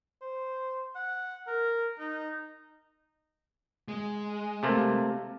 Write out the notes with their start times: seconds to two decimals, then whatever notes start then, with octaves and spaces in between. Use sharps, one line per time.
0.21 C5
0.95 F#5
1.47 A#4
1.99 D#4
3.88 G#3
4.63 C3 A3 A#3